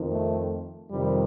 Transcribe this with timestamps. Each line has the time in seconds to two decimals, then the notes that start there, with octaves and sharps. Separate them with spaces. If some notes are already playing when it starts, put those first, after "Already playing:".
Already playing: F2 D#3
0.10 A3
0.90 F2 C3 D#3 G3